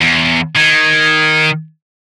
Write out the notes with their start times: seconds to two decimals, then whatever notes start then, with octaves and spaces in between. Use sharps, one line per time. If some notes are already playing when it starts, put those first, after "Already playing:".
0.02 E2
0.56 D#3 G#6